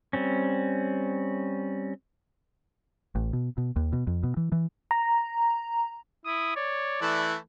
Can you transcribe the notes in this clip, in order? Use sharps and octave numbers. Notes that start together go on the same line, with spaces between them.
G3 C4 C#4
A1
B2
B2
D#2
B2
F2
B2
E3
E3
A#5
E4 D#6
C#5 D5
E3 A3 E4 F#6